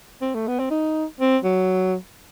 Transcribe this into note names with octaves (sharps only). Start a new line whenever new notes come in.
C4
A3
B3
C4
D#4
C4
F#3